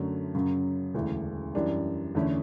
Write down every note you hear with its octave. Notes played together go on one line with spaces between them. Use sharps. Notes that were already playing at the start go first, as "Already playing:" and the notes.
Already playing: F#2 D3 F#3 A3 C#4
F#2 C#3 F#3
E1 D2 C#3 E3
F#2 E3 G3 D4
E2 D3 A3 C#4 E4